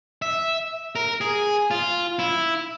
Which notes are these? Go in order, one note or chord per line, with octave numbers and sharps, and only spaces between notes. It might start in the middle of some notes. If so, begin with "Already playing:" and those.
E5
A#4
G#4
F4
E4